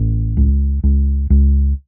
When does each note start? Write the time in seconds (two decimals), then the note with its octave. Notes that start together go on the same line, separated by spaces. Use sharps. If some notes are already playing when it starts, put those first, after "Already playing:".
Already playing: A1
0.37 C#2
0.84 C#2
1.30 C#2